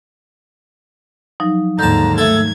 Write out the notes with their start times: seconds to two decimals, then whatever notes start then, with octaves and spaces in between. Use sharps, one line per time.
1.40 F3 F#3 D#4
1.79 D#2 G#2 D3 A#3 A5 A#5 G6
2.18 A3 A4 G#6